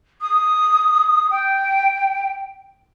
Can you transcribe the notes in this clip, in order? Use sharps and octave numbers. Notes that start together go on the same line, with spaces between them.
D#6
G5